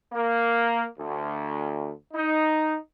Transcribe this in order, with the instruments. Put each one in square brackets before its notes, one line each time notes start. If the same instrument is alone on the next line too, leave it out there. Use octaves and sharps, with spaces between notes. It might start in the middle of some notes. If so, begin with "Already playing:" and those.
[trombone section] A#3
D2
D#4